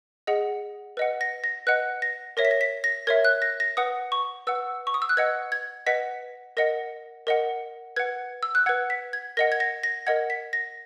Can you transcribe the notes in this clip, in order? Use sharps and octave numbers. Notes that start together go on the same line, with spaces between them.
G#4 D#5 F#5
B4 D#5 F#5
A#6
A#6
B4 D#5 F#5 F#6
A#6
A#4 C#5 E5 A#6
B6
A#6
B6
A#6
A#4 C#5 E5 G#6
F#6
A#6
A#6
B4 F#5 D#6
C#6
B4 F#5 E6
C#6
D#6
E6
F#6
B4 D#5 F#5 G#6
G#6
B4 D#5 F#5 B6
A#4 D#5 F#5 A#6
A#4 D#5 F#5
B4 F#5 G#6
E6
F#6
B4 F#5 G#6
B6
G#6
A#4 D#5 F#5 A#6
G#6
A#6
A#6
A#4 D#5 F#5 G#6
B6
A#6